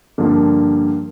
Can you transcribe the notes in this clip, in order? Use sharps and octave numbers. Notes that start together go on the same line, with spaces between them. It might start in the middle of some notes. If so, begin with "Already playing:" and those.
G2 D3 F3 A#3